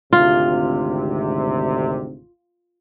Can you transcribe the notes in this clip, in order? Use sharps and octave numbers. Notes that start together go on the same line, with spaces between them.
G#1 D2 C3 F4